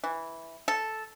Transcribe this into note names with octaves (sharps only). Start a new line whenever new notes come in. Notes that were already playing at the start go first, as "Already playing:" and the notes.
E3
A4